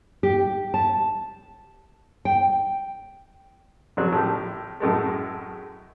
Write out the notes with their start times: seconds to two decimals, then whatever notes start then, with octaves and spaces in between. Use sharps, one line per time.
0.23 G4
0.74 A5
2.25 G5
3.97 F2 C#3 F#3 F#6
4.12 A2 F3 G4
4.80 F#2 A2 G#3 A3